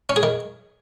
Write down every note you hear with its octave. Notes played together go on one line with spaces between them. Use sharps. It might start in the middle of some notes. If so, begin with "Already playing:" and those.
C#4
G#4
D#3